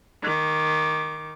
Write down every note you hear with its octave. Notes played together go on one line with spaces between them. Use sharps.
D#3 D6